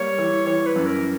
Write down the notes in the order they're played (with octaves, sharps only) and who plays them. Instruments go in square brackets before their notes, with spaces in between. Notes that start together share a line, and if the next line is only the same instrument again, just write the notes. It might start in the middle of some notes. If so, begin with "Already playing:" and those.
Already playing: [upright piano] G3 A#3 [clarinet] C#5
[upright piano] E3
[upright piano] E3 [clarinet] C#5
[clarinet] B4
[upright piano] F#2
[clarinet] A#4